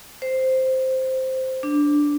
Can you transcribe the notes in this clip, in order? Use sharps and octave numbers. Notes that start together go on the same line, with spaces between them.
C5
D4